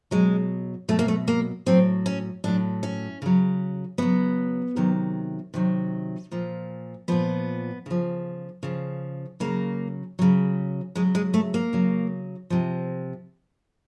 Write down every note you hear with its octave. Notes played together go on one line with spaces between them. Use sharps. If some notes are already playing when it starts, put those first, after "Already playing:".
B2 F#3 G#3
B2 F#3 A3
A#3
A3
A#3
A2 F#3 C4
C#4
A2 F#3 D4
C#4
C#3 F#3
C#3 F#3 B3
C3 D#3 F#3
C3 D#3 F#3
A#2 F3
A#2 F3 B3
C#3 F3
C#3 F3
C#3 F#3 A#3
C#3 F#3
C#3 F#3 G#3
G#3
A3
A#3
C#3 F#3
C3 F3